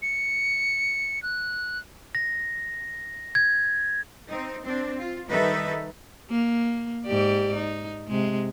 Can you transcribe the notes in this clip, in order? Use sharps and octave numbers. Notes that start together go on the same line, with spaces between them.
C#7
F#6
A#6
G#6
C4 D#4
C4 D4
F4
D#3 G3 D#4 A4 B4 E5
A#3
G#2 G4 D5
D#4
C3 G#3